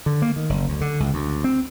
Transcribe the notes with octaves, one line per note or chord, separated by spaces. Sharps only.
D3
A#3
D#3
F#1
D2
D3
C#2
D2
C4